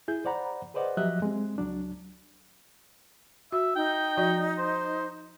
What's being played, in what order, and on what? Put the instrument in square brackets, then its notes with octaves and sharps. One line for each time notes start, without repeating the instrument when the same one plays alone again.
[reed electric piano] E4 G#4 G6
C5 D5 F#5 A#5 B5
G#4 B4 C5 D5 D#5 F#5
F3 F#3 G4 D#5 E5 F#6
G#3 C4
C#2 F#3 D4
[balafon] F#4 [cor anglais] E5
[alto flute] D#4 [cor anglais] G5
[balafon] F3 F#4 D5
[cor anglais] C5